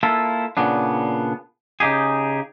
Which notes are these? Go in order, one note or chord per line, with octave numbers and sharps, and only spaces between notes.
A#3 E4 F4 A4
A#2 C#3 B3 D4
C#3 D#4 G4 G#4